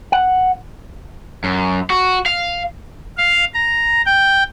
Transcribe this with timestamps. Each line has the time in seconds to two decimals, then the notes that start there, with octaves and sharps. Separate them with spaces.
0.12 F#5
1.44 F#2
1.90 F#4
2.26 F5
3.17 F5
3.54 A#5
4.06 G5